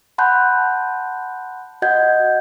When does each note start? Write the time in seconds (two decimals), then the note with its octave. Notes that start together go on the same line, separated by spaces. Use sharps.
0.18 F#5 A5 B5 C6 F#6 G6
1.82 F#4 D#5 F#5 G6 G#6